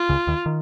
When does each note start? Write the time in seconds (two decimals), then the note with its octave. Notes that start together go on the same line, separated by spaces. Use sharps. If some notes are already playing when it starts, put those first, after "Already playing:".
Already playing: F4
0.09 C#2 C#3
0.27 D#2 D#3
0.46 D#3